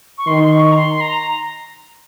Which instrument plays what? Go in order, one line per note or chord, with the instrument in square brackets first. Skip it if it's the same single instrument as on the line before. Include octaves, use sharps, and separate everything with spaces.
[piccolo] C#6
[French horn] D#3 [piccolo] C6
[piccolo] C6
C#6
A#5
C6
A#5